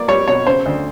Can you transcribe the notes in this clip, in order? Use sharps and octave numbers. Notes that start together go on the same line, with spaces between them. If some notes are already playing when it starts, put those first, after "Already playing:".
Already playing: A#3 D5
G3 C#5
B2 C#5
C#3 C5
D2